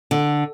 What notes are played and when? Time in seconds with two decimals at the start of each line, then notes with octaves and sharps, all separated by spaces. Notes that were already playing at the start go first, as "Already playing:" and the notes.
0.11 D3